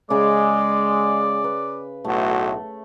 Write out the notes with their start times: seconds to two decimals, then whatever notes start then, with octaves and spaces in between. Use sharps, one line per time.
0.10 C#3 G#3 D5 G#5 D6
1.44 B4
2.05 B1 A2 A3 F#4